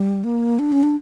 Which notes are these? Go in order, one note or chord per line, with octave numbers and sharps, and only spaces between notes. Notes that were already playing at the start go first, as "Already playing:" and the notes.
Already playing: G3
A#3
D4
C#4
D4